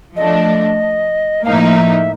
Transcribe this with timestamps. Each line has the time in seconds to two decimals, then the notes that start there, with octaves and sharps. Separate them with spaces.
0.16 F3 A3 D4 D#5
1.45 A2 F3 A#3 D#4 F5
1.53 E5
1.60 D#5
1.68 E5